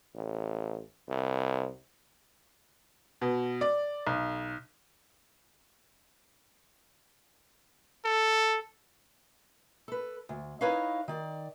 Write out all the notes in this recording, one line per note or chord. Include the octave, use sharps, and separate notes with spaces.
A1
C2
B2
D5
B1
A4
A4 B4
D2
D#4 E4 B4 C#5 D#5 F5
D#3 D5